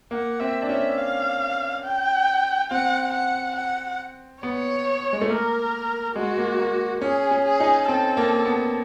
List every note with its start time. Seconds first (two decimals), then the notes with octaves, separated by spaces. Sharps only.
0.11 A#3 F#5
0.40 C4 E5
0.62 D4
0.69 C#4 E5
0.98 F5
1.84 G5
2.71 C4 F#5
3.14 F#5
3.56 F#5
4.43 B3 C#5
5.13 G#3
5.22 A3
5.29 A#3 A#4
6.15 G#3 F#4
6.38 A#3
6.59 A#3
7.02 C#4 G#4
7.31 C#4
7.46 G#4
7.60 D#4
7.88 C4 A4
8.17 A#3
8.46 B3